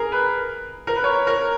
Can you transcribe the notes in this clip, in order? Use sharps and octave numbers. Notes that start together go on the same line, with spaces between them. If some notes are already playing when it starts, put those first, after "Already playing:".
Already playing: G#4 A#4
B4
A#4
B4
C#5
A#4